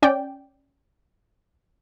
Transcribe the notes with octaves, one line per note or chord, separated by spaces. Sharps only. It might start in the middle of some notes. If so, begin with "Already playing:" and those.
C#4 D5 G5